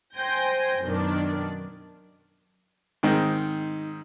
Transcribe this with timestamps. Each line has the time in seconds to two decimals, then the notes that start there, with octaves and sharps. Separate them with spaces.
0.17 C5 G5 G#5 G6 A#6
0.84 F#2 B2 D#3 D4 D5
3.03 G#2 D#3 C4 D#4